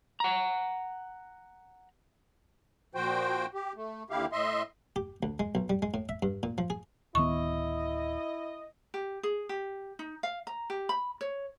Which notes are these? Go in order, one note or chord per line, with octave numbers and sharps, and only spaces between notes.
F#5 A#5
A#2 F3 F#4 C5 G5
G4
A3
D#2 D3 E4 G4 F5
A2 D#5 E5 C6
G4
D2
G#3
B1
G3
G#3
A2
E5
G2
A#2
F3
G#4
D1 D#3 B3 E4 D#5 C#6
G4
G#4
G4
D#4
F5
A#5
G4
B5
C#5